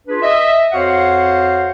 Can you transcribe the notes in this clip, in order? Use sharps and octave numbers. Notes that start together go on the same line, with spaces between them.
D4 F4 G#4 B4
D#5 E5
F2 F#4 C5 C#5 F5 F#5